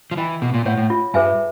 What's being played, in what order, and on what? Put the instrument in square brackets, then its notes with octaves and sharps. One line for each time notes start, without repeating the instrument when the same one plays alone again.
[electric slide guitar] F3
[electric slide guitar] E3 [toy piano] D#5 G5 B5
[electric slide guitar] B2 [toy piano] G#4
[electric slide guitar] A#2
[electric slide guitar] A2 [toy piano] C#5 F#5
[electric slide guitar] A2
[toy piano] F4
[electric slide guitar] G2 [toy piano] G#4 B4 E5 G#5